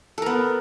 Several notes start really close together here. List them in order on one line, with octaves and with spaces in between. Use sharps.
A4 A#4 B3